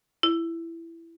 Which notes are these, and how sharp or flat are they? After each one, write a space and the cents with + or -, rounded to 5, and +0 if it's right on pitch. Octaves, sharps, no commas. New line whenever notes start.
E4 +15